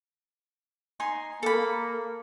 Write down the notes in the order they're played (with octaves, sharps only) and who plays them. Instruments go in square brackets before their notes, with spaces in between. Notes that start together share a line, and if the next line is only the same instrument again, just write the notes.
[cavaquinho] D#4 G#5 C6
[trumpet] A#3 [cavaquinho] A4 B5